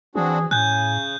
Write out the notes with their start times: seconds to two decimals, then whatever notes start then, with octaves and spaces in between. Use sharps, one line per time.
0.16 E3 C4 D4 F#4 G#4
0.51 A2 C#3 G#5 F#6 G6